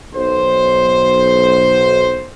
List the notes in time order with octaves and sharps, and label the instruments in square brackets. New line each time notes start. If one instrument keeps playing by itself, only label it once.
[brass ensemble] B1 C5